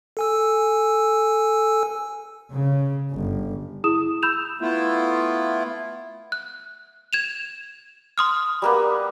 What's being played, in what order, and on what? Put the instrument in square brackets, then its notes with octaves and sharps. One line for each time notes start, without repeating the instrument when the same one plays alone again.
[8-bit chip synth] A4 G#5 E6
[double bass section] C#3
G1
[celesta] E4 G#4 D#6 E7
B5 E6 G6 E7 F7
[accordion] A3 B3 E4 F4
[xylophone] F#6
G#6 E7 F7
C6 D#6 F6
[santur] G3 A#3 B3